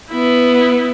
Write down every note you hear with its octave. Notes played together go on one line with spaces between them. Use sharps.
B3 E4